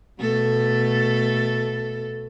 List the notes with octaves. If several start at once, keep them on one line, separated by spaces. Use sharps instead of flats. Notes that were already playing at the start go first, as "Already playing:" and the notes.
B2 A3 A4